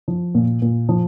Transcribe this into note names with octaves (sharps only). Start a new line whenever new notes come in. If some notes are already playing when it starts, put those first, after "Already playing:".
F3
A#2
A#2
F3